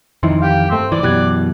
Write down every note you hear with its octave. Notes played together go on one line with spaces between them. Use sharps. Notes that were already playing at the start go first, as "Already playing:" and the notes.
F2 D#3 E3 D#4 E4 C6
G4 F5
G2 A3 C4
E3 D5
F#2 B2 E3 G4 F#6 G#6